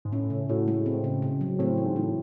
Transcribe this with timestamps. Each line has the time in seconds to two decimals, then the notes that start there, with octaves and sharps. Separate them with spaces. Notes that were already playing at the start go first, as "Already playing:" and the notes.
0.05 G#2
0.12 A2 C#4
0.30 C#3
0.49 A2 F#4
0.68 G#3
0.86 C4
1.04 C#3
1.22 C#3
1.41 F#3
1.59 A2 C4
1.77 E3
1.85 G#2
1.96 A2 E3